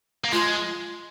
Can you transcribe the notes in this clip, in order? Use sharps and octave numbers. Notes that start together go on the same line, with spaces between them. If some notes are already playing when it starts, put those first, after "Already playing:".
A#3
G#3 F4